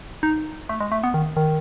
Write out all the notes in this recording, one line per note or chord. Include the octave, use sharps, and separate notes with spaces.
D#4
A3
G#3
A3
B3
D#3
D#3